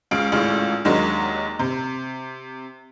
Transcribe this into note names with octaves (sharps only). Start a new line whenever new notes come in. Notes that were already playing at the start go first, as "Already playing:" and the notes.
C#2 C#3 F5 D7
G#1 C#2 A2 C#3
D#2 D#3 F#3 G#3 D4
C3